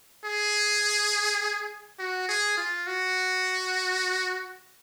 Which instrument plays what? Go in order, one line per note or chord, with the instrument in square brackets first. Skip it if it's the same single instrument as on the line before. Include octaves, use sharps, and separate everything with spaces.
[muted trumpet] G#4
F#4
G#4
F4
F#4